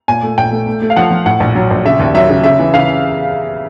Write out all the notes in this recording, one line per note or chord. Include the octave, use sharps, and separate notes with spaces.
A#2 G#5
A3
A#1 G5
A3
A3
A3
F5
F3 F#5
F3
A2 F#5
A#1
F#3
A#1
C#3 E5
D#2
F#3 E5
C#3
C#3 E5
E3
C#3 F5